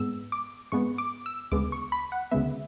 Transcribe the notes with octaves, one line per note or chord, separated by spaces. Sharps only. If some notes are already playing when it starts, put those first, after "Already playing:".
Already playing: G#2 G#3 B3 E6
D6
G#2 G#3 B3 C#6
D6
E6
D2 C#3 G#3 B3 D6
C#6
B5
F#5
D2 C#3 G#3 B3 E5